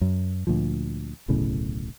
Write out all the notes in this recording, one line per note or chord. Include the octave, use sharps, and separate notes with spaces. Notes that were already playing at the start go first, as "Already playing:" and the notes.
F#2
D2 A#2 F3
D1 B1 A2 C#3